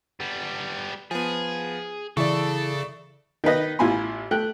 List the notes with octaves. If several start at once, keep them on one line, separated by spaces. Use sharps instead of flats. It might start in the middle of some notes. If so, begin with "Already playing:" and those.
G3 B3
F3 B3 G#4
C#3 E3 A4 D5 E5 C#6
D#3 D#4 B4 D#5
A1 E4 F4 G#5 B5 C6
A3 G5 F#6